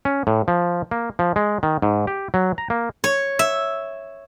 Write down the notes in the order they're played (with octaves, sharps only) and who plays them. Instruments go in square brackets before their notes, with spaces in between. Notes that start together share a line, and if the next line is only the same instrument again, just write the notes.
[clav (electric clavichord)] C#4
A2
F3
A#3
F3
G#3
D#3
G#2
G4
F#3
A#5
A#3
[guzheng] C#5
E5